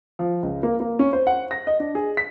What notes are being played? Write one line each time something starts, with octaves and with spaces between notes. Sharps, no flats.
F3
C#2
A#3
A#3
C#4
C5
F#5
A#6
D#5
D4
G#4
B6